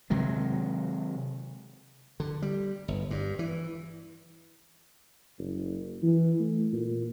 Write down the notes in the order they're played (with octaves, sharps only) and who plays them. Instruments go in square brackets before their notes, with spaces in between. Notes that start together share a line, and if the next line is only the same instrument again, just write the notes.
[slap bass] C3 D#3 F#3 G#3
D3
G3
G1
G2
E3
[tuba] F#1
E3
A3
A#2